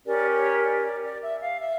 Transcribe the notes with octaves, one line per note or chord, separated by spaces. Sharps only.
C#4 G4 A#4 D5
C#5
D5
D5
D5
E5
F5
E5